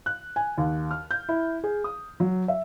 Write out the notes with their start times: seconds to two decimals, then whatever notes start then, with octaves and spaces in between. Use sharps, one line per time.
0.06 F#6
0.36 G#5
0.58 D#2
0.91 F6
1.11 G6
1.29 E4
1.64 G#4
1.84 D#6
2.20 F#3
2.48 E5